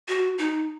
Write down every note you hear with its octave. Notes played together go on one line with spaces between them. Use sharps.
F#4
D#4